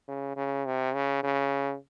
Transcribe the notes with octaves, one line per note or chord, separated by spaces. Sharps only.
C#3
C#3
C3
C#3
C#3